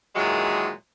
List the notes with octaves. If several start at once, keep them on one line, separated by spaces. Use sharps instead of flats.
A#2 D#3 E3 F#3 G#3